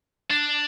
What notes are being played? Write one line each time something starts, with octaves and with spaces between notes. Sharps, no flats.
D4